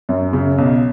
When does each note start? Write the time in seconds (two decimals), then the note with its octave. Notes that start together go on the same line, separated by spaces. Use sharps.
0.09 F#2
0.33 C#3
0.58 B1